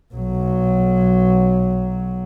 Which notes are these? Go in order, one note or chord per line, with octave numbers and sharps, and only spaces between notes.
B1 F#3